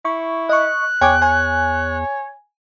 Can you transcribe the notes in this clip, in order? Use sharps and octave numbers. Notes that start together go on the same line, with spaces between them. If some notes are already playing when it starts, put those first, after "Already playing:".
E4 C#6
D#5 C#6 F#6
E2 C#5 G5 G#5 D6
C#5 G#5